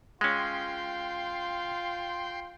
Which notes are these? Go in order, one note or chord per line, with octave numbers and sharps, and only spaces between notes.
G#3 C#4 F4 G5 C6